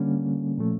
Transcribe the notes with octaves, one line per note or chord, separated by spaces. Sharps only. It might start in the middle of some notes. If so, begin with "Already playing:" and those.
Already playing: D3 G3 A#3 C#4
A#2 F3 A3